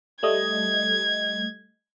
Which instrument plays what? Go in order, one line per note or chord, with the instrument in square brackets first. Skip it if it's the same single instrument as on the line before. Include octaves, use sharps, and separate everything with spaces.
[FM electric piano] G3 A3 D#5 [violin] G#6